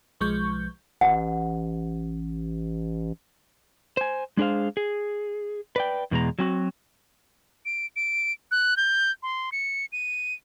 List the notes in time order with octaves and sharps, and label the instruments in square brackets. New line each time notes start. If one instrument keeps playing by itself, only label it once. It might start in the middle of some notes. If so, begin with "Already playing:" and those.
[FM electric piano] B1 F3 G#3 C#6 G6
[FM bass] A1 [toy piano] F#5
[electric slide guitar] C5 G#5
G#3 D4 G#4 C5 F5
G#4
B4 D5 G5
E2 B2 G#3 A#5
F#3 C4 F#4
[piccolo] D7
D7
F#6
G6
C6
C#7
D#7